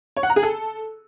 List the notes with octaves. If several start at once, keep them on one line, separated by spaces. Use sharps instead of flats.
C#5
F#5
A#5
G#4
A4